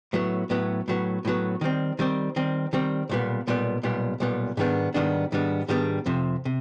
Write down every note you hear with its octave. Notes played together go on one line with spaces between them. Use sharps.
A2 F#3 B3
A2 F#3 B3
A2 F#3 B3
A2 F#3 B3
D#3 G3 C4
D#3 G3 C4
D#3 G3 C4
D#3 G3 C4
B1 A#2 G3 B3
B1 A#2 G3 B3
B1 A#2 G3 B3
B1 A#2 G3 B3
G#2 D#3 G3 B3 D4
G#2 D#3 G3 B3 D4
G#2 D#3 G3 B3 D4
G#2 D#3 G3 B3 D4
F2 C3 F3
C3